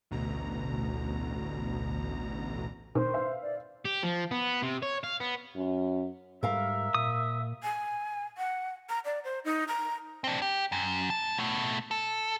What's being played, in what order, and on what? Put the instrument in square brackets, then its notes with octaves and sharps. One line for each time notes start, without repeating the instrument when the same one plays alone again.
[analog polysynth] A1 D2 B2 A#5
[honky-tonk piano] D#3 [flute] C5
[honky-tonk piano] B4 E5 F5
[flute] D5
[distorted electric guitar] G4
F3
B3
C3
C#5
F5
B3
[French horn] F#2
[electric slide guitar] G#2 G3 [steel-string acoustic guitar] A#4 F5 A#5 [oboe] E5
[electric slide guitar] A#2 [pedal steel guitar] D#6
[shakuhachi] G#5
F#5
A#5
D5
C5
D#4
A#5
[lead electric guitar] C4 D4
G4
F#2
A2 A5
B2 A3
A4